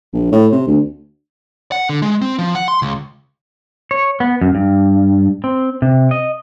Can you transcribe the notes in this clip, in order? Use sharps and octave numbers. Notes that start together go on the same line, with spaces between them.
A#1
A2
C3
D2
F#5
D3
G#3
C4
F3
F#5
C6
C#2
C#5
B3
F#2
G2
C4
C3
D#5